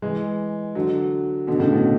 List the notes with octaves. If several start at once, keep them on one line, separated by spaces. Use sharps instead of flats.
E3 G#3
D3 F#3
B2 D3
A2 C#3
B2